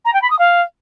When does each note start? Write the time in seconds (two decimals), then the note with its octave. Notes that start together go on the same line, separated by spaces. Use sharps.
0.05 A#5
0.13 G5
0.22 B5
0.30 D#6
0.39 F5